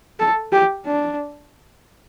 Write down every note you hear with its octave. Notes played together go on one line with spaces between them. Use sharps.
A4
G4
D4